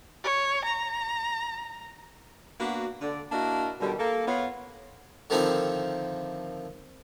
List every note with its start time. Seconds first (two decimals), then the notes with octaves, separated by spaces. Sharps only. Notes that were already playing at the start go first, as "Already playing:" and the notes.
0.24 C#5
0.65 A#5
2.60 A#3 B3 D4 F#4
3.01 D3 D5
3.32 A#3 D4 E4 F#4 A#4 D#5
3.80 B2 D3 D#3 G3
3.98 A#3 A4
4.27 B3 F4 C#5
5.30 D3 D#3 F3 C4 D#4 E4